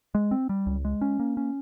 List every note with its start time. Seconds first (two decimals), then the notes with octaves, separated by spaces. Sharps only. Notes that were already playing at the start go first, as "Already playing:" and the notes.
0.15 G#3
0.31 C4
0.49 G3
0.66 C#2
0.85 G#3
1.01 C#4
1.20 A#3
1.37 C#4